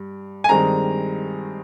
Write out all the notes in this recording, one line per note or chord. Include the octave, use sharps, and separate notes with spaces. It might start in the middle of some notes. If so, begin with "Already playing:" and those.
Already playing: G2
G#5
G2 D#3 G#3 C4 A#5